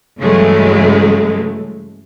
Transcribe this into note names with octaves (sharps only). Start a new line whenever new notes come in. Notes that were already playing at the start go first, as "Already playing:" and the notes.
G2 C#3 E3 F#3 G#3 A3